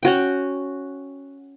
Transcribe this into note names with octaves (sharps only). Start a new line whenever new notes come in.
C#4 F#4 G5